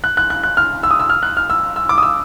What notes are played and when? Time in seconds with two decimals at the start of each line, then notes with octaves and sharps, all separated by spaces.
0.04 F#6
0.17 F#6
0.30 F#6
0.43 F#6
0.57 F6
0.83 E6
0.91 D#6
0.99 E6
1.10 F6
1.23 F#6
1.37 F6
1.50 E6
1.76 E6
1.89 D6
1.98 D#6
2.03 E6